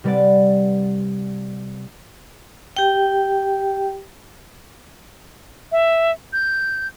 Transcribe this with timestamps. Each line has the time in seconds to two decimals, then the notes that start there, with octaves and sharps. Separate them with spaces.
0.04 C3 G3 B4 D5 F#5 A6
2.77 G4 G5
5.72 E5
6.33 G6